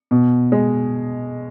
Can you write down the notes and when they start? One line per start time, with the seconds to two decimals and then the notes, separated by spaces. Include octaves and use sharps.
0.11 B2
0.52 G#3